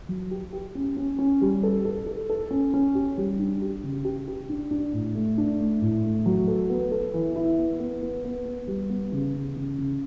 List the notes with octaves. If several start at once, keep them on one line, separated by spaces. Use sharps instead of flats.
F#3
G4
G4
C#4
C#4
C#4
G3
A4
A4
A4
A4
C#4
C#4
G4
G3
D4
G4
C#3
G4
G4
D4
D4
A2
A3
D4
A3
A2
A3
F#3
A4
B3
A4
E3
E4
B3
B3
B3
B3
B3
G3
B3
C#3
C#3
C#3
C#3